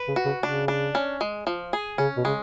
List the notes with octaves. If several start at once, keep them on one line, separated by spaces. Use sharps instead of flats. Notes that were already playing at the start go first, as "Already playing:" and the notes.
Already playing: B4
C#3
F#4
C#3
C#3 D4
D4
C#4
G#3
F3
G#4
C#3 C#4
B2
C#3 G#3